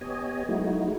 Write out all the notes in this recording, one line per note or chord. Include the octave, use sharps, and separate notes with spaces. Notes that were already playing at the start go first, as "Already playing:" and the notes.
B3 G4 C#5 D#5 G#5
F#3 G#3 A3 D#4 E4 F#4